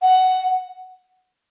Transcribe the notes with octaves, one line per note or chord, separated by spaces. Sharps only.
F#5